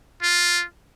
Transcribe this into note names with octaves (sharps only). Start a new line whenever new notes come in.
F4